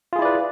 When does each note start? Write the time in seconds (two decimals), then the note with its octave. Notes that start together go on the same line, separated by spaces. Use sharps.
0.13 F4
0.16 G#4
0.19 E4
0.22 D5
0.25 B4